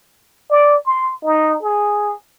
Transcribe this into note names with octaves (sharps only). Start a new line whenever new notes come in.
D5
C6
D#4
G#4